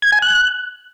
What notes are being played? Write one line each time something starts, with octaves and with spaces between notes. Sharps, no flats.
G#6
G#5
F#6